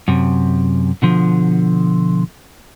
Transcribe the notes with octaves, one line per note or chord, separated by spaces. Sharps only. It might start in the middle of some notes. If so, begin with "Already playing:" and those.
F#2 C3
B2 D3 F3